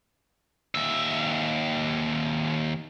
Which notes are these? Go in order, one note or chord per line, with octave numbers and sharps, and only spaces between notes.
D#2 E5